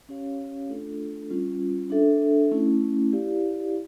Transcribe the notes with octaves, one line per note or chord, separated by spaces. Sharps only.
C#4 G4 C#5 F5
A3 D4 F4 A4
G3 C#4 F4
D4 A4 E5
A3 C#4 E4
E4 G4 D5 F5